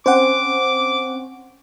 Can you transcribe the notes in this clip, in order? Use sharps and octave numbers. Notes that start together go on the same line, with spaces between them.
C4 C#4 C5 F#5 D6